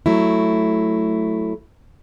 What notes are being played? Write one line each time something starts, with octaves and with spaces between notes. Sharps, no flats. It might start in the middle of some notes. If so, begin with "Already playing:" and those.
F#3 A3 E4